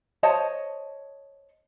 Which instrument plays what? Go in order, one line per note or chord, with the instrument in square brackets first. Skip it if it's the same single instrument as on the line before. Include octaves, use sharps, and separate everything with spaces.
[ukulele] C5 C#5 D#5 A5